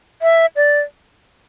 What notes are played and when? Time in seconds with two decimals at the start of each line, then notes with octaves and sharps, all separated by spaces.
0.22 E5
0.56 D5